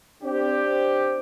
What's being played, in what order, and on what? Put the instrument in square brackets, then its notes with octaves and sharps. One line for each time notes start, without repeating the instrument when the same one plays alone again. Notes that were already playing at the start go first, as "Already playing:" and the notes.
[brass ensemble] C4 D4 G4